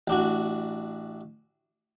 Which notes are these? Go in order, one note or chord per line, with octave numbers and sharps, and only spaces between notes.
A1 D4 F#4